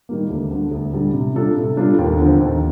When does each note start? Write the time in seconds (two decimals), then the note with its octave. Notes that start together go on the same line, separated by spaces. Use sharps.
0.09 D#3 G3 A#3
0.30 D2
0.51 D3 G3
0.71 D2
0.93 D3 G3
1.13 C3
1.35 G3 D4 F4 A4
1.56 C3
1.77 G3 D4 F4 A4
1.99 D#2
2.19 D3 F3 C4
2.40 D#2